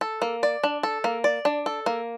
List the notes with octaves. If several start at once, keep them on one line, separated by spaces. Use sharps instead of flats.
A4
A#3
D5
D4
A4
A#3
D5
D4
A4
A#3